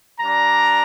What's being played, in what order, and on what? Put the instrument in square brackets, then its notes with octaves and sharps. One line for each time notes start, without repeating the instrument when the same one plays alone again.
[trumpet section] G3 D4 A#5